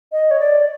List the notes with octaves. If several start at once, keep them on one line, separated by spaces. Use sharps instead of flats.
D#5
C#5
D5